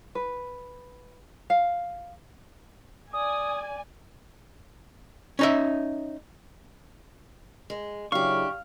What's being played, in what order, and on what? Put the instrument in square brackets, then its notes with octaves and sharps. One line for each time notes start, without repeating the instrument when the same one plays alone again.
[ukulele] B4
F5
[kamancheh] D5 [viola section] G#5 [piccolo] D#6
[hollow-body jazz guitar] C#4 D#4 E5
[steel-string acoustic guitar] G#3
[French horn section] C#3 F#3 E4 [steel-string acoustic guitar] D4 G4 [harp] F5 [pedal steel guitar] C#6